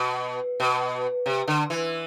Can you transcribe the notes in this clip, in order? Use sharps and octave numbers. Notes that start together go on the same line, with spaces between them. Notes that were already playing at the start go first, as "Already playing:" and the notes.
Already playing: B2
B2
C3
D3
E3